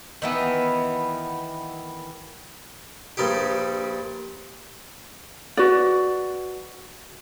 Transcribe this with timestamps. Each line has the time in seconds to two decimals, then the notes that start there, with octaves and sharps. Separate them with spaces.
0.22 D#3 E3 B3
3.17 A#1 G2 G3 D#4 G4
5.57 F#4 B4 D5